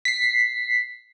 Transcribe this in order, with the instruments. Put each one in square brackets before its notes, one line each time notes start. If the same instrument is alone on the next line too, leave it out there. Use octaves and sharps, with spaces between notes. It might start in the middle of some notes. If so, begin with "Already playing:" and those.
[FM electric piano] B6 C7